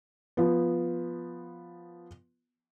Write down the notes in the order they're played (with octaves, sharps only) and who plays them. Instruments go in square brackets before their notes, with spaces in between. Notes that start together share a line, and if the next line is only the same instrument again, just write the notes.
[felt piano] F3 B3